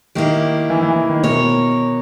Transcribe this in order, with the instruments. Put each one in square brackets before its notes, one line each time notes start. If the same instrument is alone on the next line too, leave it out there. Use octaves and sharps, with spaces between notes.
[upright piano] D#3 [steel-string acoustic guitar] A#3 E4 G4
[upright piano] E3
E3
D#3
[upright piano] B2 [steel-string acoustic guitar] A#4 C#5